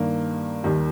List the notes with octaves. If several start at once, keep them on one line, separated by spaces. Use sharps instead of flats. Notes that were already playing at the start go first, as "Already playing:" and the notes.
Already playing: G2 D#3 A#3
D#2 D#3 G3